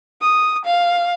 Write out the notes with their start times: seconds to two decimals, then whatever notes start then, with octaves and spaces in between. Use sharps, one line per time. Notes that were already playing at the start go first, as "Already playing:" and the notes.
0.22 D#6
0.65 F5